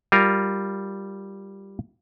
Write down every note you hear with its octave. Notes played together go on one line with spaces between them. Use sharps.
G3 F4 A#4